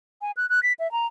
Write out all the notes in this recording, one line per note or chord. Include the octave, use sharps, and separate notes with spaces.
G#5
F#6
F#6
B6
E5
A#5